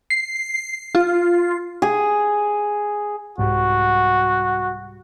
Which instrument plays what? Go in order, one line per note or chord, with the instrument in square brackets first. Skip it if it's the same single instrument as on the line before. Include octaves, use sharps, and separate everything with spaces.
[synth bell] C7
F4
[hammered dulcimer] G#4
[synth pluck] C2 G#2 G3 [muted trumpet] F#4